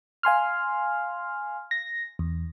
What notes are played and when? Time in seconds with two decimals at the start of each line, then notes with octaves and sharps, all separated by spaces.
0.23 F5 G#5 C6 F6
1.71 A#6
2.19 E2